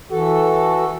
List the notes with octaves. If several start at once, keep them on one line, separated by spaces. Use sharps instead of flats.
E3 F#4 A4